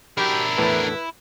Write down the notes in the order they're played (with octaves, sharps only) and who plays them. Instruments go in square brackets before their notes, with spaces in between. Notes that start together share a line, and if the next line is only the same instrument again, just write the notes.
[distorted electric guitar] D4 A#4 [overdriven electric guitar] E4 [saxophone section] F#4 G4
[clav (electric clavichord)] E2 A2 A3 [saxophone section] B4